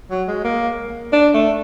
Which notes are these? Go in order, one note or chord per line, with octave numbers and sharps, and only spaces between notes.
F#3
G#3
A#3
D4
A3